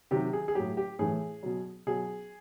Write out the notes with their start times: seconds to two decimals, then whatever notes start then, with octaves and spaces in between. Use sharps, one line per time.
0.11 C3 D#3 F#3 G4
0.33 G#4
0.48 G#4
0.55 A2 F#3 G4
0.77 G4
0.99 A2 E3 G#4
1.43 B2 F#3
1.87 B2 F#3 G#4